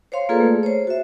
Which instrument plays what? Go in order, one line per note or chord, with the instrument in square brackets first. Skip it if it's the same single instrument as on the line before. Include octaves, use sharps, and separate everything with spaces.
[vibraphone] C5 C#5 F5 C6
A#3 F4 G#4 A4 B4 D5
A3
C5 C#5
F#4 E5